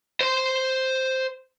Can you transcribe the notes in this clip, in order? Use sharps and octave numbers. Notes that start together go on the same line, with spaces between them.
C5 C6